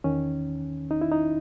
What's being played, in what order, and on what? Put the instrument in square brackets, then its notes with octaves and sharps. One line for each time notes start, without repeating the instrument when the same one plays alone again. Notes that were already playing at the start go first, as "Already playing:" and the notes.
[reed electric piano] E2 D#3 C#4
D#4
E4
D#4